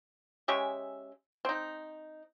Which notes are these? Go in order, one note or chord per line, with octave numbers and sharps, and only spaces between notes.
G#3 C#4 G4 E5
C4 D#4